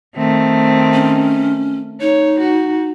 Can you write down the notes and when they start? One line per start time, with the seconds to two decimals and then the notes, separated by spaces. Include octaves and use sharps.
0.16 D#3 A3 C4
0.94 C#4
2.01 D#4 C#5
2.40 F#4